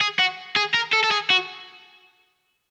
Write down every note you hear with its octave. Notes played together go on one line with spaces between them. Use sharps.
G#4
F#4
G#4
A#4
A4
A4
G#4
F#4